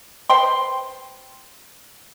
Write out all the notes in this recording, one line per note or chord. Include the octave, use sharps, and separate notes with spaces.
B4 C5 G5 C6